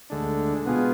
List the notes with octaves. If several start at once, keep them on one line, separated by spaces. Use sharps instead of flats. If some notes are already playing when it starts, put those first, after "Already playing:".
D2 D3 G#3 D4
B2 G#3 B3 F4 G#4